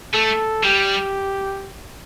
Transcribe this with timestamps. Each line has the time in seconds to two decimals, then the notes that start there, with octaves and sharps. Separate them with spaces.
0.14 A3 A4
0.64 G3 G4